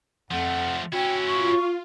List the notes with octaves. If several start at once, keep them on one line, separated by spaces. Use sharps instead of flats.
F2 F3 A3 F#5
C#4 E4 F#4 G5
F4 C#6